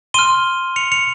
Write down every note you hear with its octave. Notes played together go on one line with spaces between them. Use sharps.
C6 F6 D#7 G7
C#7 F7
C#7 F7